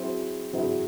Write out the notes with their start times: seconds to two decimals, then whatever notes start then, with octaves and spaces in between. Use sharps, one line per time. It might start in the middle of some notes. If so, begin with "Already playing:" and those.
Already playing: F#3 C4 E4 G#4
0.53 F#3 C4 E4 G#4